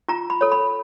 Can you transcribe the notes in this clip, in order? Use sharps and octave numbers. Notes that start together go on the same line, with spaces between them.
F4 A#5
B5
A4 C#5
B5